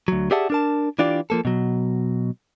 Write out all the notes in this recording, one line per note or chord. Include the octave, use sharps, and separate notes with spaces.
D2 F#3
G4 G#4 D5 E5 F#5 A5
D4 A#4 A5
E3 D4 F4 G4 D5
F3 A#3 A4
B2 F#3